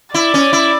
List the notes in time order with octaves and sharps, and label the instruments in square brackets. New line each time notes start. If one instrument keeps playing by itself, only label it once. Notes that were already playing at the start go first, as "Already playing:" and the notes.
[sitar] E4 [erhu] D5
[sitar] C#4
E4